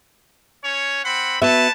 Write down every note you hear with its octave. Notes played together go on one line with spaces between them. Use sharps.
C#4 C#5
C4 F#5 B5
B3 F#4 B4 C#5 E5 A5